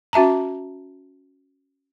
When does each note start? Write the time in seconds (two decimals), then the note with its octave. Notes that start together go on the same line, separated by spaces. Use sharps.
0.13 C#4 F#4 E5 A5 A#5